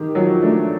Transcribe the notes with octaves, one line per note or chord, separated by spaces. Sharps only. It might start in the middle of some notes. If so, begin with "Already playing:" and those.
Already playing: D#3 G4
F3 F#3
A3 D4